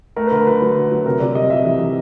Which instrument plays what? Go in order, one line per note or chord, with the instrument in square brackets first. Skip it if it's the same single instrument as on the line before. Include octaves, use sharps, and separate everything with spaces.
[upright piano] A3 [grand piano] A#4
[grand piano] B4
[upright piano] D3 [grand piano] A#4
[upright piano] F#3 [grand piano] B4
[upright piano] F#3
D3
F#3
[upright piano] C3 [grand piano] A#4
[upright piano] C3 [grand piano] D5
[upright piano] G3 [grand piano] D#5
[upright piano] C3 [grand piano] E5
[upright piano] E3
E3